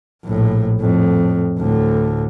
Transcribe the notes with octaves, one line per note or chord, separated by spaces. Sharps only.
A#1 A2
F2 A2
D2 A2